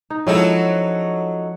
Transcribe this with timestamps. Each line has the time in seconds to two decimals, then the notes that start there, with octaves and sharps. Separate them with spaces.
0.10 D#4
0.27 F3 F#3 G#3 C#4 D#4 E4 A4 C#5